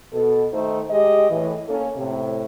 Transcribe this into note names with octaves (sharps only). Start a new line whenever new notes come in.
B2 A4
D#3 A3 D#4 C5
G#3 G4 D#5
A2 E3
A#3 C#4 A4
A2 C3